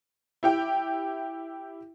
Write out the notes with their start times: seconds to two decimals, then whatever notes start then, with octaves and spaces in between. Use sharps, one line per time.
0.43 E4 G4 G5